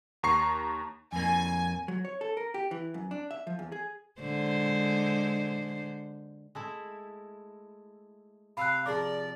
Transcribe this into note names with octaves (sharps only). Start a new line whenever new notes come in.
D#2 A#5 C#6 C7
F2 A#3 G#5
F#3
C#5
A4
A#4
G4
E3
F#2
D4
E5
F3
E2
G#4
D3 G#3 C5
G#3 A3 E4
C3 F5 B5 E6 F#6
F3 G#4 A#4 D5 D6